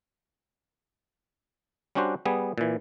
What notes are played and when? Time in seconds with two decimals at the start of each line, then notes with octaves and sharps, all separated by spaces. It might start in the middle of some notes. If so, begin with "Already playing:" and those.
1.95 G3 C#4 D4 F#4 C5
2.25 G3 B3 G#4
2.58 A#2 E3